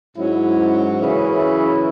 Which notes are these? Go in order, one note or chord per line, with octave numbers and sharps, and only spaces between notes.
G#2 F#3 C#4 E4
F#2 C#3 E3 C#4 E4